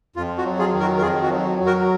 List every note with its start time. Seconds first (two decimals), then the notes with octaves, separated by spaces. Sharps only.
0.16 F2 F4
0.38 F#4
0.45 F#3
0.59 F4 G#4
0.73 D#3
0.80 F#4 A#4
0.98 A#4
1.02 F2 F4 G#4
1.23 F#4
1.30 F#3
1.58 F#3
1.66 F#4 A#4